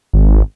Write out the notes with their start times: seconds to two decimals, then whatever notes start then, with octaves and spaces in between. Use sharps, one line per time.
0.13 G#1